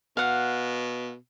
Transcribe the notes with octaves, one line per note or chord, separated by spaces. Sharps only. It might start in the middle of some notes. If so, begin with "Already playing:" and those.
B2 F5 F#5